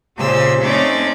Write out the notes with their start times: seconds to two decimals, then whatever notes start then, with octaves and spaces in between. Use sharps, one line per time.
0.17 A#2 C#3 G4 C5 E6
0.63 A3 C4 C#4 D#4 C#5 D5